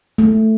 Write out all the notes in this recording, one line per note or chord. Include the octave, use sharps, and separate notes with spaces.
A3